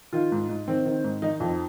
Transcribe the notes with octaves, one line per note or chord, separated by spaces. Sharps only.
D#3 F4
G#2
G#2
D#3 C4
D#3
G#2
D#3 D#4
F2